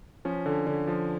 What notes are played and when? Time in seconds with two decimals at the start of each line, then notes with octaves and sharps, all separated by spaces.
0.25 F3 C#4
0.46 D3
0.67 D3
0.88 F3